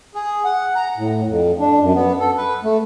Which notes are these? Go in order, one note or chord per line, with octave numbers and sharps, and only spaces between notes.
G#4
F#5
A#5
A2
F2
D4
F#2
B3
A4
B4
A3